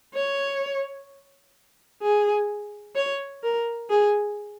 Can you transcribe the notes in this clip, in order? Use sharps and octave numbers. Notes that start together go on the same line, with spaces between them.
C#5
G#4
C#5
A#4
G#4